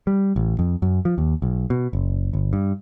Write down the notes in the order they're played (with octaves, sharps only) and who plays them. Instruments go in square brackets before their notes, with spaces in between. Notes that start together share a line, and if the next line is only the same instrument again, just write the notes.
[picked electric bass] G3
A1
F2
F#2
F3
D#2
B1
B2
F#1
G1
G2